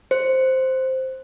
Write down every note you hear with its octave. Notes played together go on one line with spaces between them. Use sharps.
C5